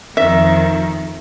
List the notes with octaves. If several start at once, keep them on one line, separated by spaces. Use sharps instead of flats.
F2 D#3 E5